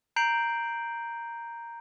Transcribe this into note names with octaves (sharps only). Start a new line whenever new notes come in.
A#5 G6 C7 D7 F#7